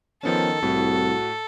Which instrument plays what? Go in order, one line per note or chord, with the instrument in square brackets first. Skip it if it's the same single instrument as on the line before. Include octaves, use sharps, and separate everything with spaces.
[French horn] D#3 [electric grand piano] F3 B3 C#4 [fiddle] A4
[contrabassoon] C2 [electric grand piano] A2 [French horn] F#4